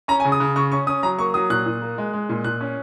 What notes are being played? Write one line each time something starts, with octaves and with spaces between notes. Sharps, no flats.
C#4 A#5
G#5
C#3
D#6
C#3
C#3 C#6
C#4 C#6
C#4 D#6
F#3 A#5
A#3 C#6
F#3 D#6
A#2 F#6
A#2
A#3
G#3
G#3
A#2
A#2 F#6
C#4